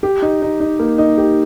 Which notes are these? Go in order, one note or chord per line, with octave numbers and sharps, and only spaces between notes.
G4
D#4
D#4
D#4
A#3
D#4
G4